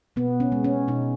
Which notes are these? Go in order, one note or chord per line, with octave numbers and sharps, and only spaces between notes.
B2 B3
C#4
G#3
C#4
B2 D#4